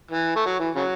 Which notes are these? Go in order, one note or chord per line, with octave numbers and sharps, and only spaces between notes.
E3
A3
F#3
E3
C#3 F#3